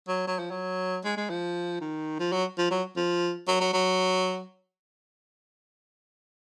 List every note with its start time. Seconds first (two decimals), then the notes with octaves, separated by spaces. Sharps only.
0.08 F#3
0.27 F#3
0.39 F3
0.51 F#3
1.04 G#3
1.17 G#3
1.30 F3
1.81 D#3
2.19 F3
2.32 F#3
2.58 F3
2.71 F#3
2.96 F3
3.47 F#3
3.60 F#3
3.73 F#3